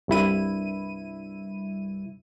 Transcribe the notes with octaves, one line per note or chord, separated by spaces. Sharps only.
C2 G2 E4 D#7